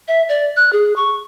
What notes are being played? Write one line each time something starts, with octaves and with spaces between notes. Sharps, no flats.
E5
D5
F#6
G#4
C#6